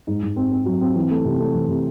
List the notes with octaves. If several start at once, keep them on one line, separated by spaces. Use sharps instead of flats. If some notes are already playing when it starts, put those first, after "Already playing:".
G#2
G#2
C4
C4
F#3
C4
E3
A3
C3
A3
E3
C3